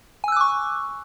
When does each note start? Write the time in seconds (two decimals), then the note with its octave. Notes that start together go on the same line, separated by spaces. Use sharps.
0.24 G#5
0.28 E6
0.32 F#6
0.36 D6
0.41 C#6